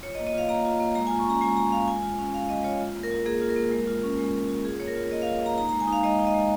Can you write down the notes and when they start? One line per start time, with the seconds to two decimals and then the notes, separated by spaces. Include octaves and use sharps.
0.03 F4 C#5
0.15 D#5
0.19 A#3
0.27 D#5
0.34 F4 F5
0.49 A#3 A#5
0.65 F4
0.80 A#3
0.95 G#3 A#5
1.07 G#5
1.10 F4
1.19 C#6
1.27 C#4 A#5
1.41 G#3 G#5
1.56 G#3 A#5
1.72 F4 F5
1.88 G#3 G#5
2.03 F4
2.19 C#4
2.33 G#3 F5
2.44 F5
2.49 G#3 D#5
2.64 F4 C#5
2.80 F4
2.95 A#3
3.03 A#4
3.11 F4
3.26 A#3 G#4
3.41 F4
3.49 A#4
3.56 A#3
3.72 G#3
3.87 F4
4.03 C#4
4.19 G#3
4.34 G#3
4.49 F4
4.65 F4 G#4
4.80 A#3 C#5
4.88 A#4
4.96 F4
5.11 A#3 D#5
5.22 F5
5.27 F4
5.42 A#3 A#5
5.57 D#4 A#5
5.69 A#5
5.72 G#3
5.80 G#5
5.88 D#4 F5
6.03 G#3 D#5
6.19 D#4
6.27 D#5
6.34 G#3